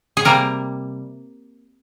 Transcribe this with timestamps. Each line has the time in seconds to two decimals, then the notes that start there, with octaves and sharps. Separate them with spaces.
0.17 G#4
0.25 C3 G3 A#3 A#4